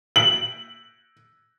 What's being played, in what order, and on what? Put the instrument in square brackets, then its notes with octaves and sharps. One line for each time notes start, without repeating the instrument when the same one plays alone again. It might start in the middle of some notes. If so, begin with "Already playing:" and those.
[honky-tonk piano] F#7